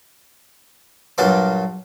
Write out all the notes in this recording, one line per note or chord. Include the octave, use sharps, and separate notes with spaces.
G2 A#2 F#3 F5 A5 D6